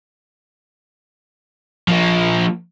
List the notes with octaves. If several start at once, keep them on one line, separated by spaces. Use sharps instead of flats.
F3 A#3